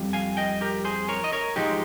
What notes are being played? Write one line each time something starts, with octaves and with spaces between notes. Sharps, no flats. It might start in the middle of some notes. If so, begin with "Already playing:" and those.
Already playing: F2 G3
F5 G#5
D#5 G5
G4 A#4
G#4 C5
A#4 C#5
D#5
A#4 C#5
G#2 F3 G#3 D#4 G4